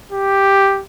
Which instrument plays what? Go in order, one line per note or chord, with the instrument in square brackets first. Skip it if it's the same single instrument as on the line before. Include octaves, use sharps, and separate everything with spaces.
[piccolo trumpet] G4